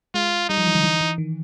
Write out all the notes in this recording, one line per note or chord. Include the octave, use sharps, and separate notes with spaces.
G#3 F4
G3 D#4
F3
E3
D3
E3
E3
D#3